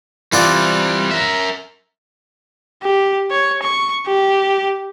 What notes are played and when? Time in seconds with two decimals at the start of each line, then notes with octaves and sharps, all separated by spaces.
0.32 E3 G3 C4 F4 D5
1.11 A#4 E5
2.83 G4
3.31 C#5
3.62 C#6
4.07 G4